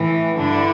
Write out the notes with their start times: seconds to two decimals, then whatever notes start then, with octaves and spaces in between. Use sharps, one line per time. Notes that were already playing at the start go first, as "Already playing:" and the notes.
Already playing: A2 E3
0.36 G2 D3 D4 E4